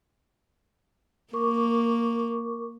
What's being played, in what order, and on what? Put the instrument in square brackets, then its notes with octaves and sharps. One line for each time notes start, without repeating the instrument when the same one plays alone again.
[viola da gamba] A#3 [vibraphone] A#4 C#6 D6